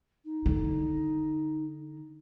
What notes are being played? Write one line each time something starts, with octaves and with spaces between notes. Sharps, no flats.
D#4
D3